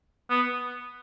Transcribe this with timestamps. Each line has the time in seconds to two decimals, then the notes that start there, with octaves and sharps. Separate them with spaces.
0.30 B3